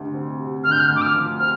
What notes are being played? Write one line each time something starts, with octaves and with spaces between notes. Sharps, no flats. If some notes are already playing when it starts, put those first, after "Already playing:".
Already playing: D2 C3
C4
C3
D2 F6
G6
F6
D2
D6
F6
F3
C4 F6